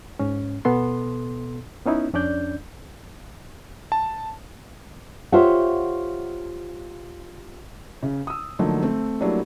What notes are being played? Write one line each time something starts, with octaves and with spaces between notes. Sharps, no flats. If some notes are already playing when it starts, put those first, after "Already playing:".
G#2 C#4
B2 B3 A4 C6
B3 C#4 D#4 E4
F2 C#4 D4 D5 G6
A5
F4 G4 C5 C#5 E5 F#5
C#3
D#6 E6
D3 F3 F#3 A3 A#3 D#4
A3 C4
F#3 G3 A3 A#3 D4 E4